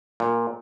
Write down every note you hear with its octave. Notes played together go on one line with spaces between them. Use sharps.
A#2